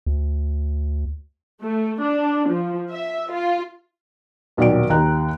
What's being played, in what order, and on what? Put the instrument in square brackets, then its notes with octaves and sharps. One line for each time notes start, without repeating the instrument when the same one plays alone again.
[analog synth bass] D2
[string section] A3
D4
F3
E5
F4
[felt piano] D#1 B1 F#3 D5 G5 D7
D#2 D#4 G5 A#5 F#6